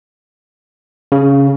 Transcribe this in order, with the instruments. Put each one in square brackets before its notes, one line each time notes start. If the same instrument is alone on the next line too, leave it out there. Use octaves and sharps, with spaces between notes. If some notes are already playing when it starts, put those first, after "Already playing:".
[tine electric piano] C#3